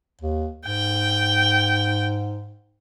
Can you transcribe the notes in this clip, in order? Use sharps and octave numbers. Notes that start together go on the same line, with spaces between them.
D#2
G#2 G5